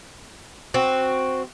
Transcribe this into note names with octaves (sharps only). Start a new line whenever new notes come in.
C4 F#4